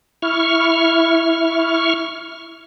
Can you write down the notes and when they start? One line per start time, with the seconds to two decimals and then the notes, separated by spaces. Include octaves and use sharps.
0.22 E4 C#6 F6